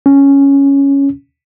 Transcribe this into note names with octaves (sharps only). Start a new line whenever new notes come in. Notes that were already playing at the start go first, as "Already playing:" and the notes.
C#4